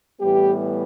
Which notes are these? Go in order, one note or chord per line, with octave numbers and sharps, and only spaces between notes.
A2 E3 G3 B3 G4